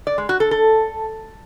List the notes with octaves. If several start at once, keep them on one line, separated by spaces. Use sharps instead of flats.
D5
G#3
F#4
A4
A4